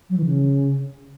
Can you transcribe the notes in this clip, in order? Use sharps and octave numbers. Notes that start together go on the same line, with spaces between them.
F#3
E3
C#3